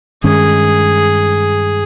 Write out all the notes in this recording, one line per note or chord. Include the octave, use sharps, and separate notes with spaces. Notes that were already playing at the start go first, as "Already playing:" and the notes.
G2 D#3 G#3 C#4 G#4